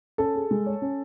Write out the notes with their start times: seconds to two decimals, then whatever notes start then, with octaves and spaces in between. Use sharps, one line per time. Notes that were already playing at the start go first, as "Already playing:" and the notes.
0.18 C#4 A4
0.35 G#4
0.51 G#3
0.66 C#5
0.81 C#4